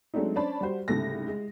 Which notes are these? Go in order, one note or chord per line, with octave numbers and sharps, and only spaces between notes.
F#3 G#3 A3 C4 D4 D#4
C#4 D4 C5 D5 A5 B5
G3 F#4 C5
C2 G#2 C#3 A3 A#6
G#3